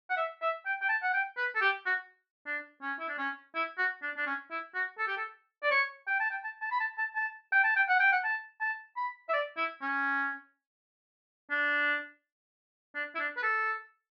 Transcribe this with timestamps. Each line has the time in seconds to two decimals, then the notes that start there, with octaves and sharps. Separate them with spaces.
0.10 F#5
0.17 E5
0.42 E5
0.66 G5
0.81 G5
0.89 A5
1.03 F#5
1.14 G5
1.37 B4
1.55 A4
1.62 G4
1.86 F#4
2.46 D4
2.82 C#4
2.99 E4
3.09 D4
3.18 C#4
3.55 E4
3.78 F#4
4.03 D4
4.17 D4
4.27 C#4
4.51 E4
4.75 F#4
4.99 A4
5.08 G4
5.17 A4
5.63 D5
5.71 C#5
6.07 G5
6.20 A5
6.31 G5
6.44 A5
6.62 A5
6.72 B5
6.80 A5
6.98 A5
7.16 A5
7.52 G5
7.64 A5
7.76 G5
7.89 F#5
8.00 G5
8.12 F#5
8.24 A5
8.61 A5
8.97 B5
9.29 E5
9.33 D5
9.57 E4
9.82 C#4
11.51 D4
12.95 D4
13.15 E4
13.19 D4
13.37 B4
13.43 A4